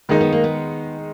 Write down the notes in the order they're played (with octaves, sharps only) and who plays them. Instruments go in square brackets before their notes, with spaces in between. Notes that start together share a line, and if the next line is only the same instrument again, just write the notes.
[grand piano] D#3 G#3 D#4 [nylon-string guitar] A#3
[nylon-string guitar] B3
A#3
B3